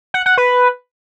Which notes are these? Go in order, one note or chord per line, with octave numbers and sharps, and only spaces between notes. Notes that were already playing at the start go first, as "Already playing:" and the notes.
F#5
F#5
B4